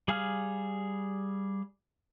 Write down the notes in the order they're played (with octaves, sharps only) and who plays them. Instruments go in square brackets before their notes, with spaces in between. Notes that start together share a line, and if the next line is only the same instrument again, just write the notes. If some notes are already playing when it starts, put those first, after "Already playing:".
[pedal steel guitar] G3 G#4 F5 G#5 F6